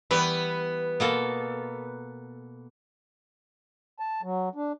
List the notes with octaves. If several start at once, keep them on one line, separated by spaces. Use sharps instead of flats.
E3 G3 B3 B4
B2 A#3 A4
A5
F#3
D4